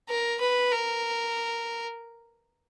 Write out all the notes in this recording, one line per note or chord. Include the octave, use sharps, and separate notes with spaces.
A#4
B4
A#4